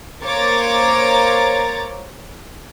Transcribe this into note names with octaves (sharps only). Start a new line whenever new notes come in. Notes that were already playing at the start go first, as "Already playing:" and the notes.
A#3 C5 C#5 A#5 D6 A6